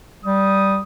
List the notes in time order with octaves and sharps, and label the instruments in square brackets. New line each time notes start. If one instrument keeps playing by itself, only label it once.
[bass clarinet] G3 [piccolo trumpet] D#6